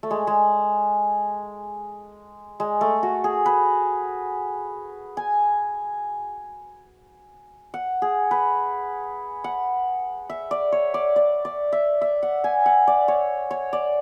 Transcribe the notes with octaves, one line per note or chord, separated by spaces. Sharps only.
A3
G#3
G#3
G#3
A3
F#4
G#4
B4
G#5
F#5
G#4
B4
F#5
E5
D5
C#5
D5
D5
D5
E5
E5
F#5
G#5
F#5
D5
C#5
C#5
D5